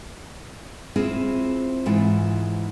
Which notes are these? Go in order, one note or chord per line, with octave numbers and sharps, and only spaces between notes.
C4 E4 F4 G#4
G#2 E3 E4 F4